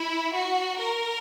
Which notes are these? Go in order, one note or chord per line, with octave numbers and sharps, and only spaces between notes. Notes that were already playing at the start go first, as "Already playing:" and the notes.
Already playing: E4
F#4
A#4